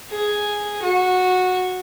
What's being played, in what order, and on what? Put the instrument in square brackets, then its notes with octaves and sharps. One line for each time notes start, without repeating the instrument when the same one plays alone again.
[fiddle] G#4
F#4